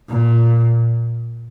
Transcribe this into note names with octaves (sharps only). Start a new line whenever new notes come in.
A#2